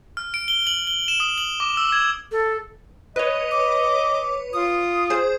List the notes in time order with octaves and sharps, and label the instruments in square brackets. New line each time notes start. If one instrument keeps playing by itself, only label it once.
[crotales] F6
D7
G7
F#7
G7
E7
D#6
F#7
D6
E6
G#6
[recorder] A4
[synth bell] B4 C#5 [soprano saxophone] D#5
[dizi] D6
[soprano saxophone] F4 [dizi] D#6
[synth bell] G#4 C5